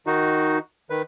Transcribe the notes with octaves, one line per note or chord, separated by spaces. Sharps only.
D#3 D#4 F#4
D#3 B4